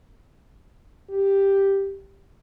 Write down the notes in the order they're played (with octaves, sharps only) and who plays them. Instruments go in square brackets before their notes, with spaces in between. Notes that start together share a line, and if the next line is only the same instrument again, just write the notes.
[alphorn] G4